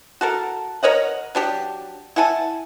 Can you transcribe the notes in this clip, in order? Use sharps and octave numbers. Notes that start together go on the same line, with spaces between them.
F#4 A4 A#4
A#4 C#5 D#5 F#5
F#3 D4 G4
E4 F#5 G#5 A5